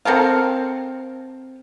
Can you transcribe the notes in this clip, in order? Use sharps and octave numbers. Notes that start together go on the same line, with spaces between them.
C4 A4 A#4 F5